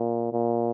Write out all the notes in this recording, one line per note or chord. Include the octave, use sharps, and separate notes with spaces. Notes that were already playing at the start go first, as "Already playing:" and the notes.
Already playing: A#2
A#2